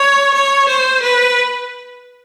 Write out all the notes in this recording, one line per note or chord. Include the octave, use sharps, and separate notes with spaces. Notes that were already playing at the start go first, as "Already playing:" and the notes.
Already playing: C#5
C#5
C5
B4